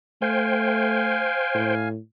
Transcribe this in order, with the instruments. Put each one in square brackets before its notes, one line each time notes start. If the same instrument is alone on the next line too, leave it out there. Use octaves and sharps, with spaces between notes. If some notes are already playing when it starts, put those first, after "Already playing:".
[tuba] A3 [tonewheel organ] C5 G5 [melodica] F5 G#5
[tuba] A2